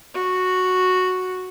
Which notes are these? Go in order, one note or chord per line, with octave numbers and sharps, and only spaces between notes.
F#4